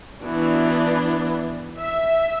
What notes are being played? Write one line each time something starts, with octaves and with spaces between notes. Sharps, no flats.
E3 B3 D4 F#4
E5